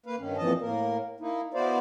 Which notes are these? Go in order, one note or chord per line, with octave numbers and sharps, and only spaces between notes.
A#3 B4 F5
G2 D#3 C#4
F2 A#2 E3 F3 D#5 A5
A2 A#3 A#4
A#3 D#4 E4
B3 E4 F#4 C5 D5 F5